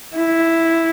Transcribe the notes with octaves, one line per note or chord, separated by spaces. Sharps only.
E4